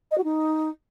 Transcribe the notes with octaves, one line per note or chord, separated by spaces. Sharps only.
D#5
F#4
D#4